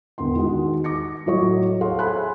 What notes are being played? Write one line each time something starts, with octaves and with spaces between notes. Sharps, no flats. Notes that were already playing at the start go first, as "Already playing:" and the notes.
E1 D3 B3 C6
D#3 G#3 F#4
D6 A#6 C#7
A2 F#3 F#4 C#5 D#5 C#6
G#4 A4 C#5 F5 F#5 C6
C5 E5 G#5 B5 C6 F#6